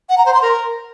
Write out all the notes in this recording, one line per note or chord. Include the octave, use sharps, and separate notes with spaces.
F#5
A#5
C5
C6
A#4